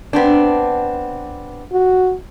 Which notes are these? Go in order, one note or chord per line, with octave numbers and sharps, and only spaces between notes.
B3 C4 D4
F#4